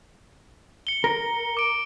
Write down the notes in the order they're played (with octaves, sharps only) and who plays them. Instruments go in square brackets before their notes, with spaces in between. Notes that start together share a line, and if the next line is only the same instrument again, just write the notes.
[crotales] C#7 G7
[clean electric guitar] A#4
[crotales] D6 D7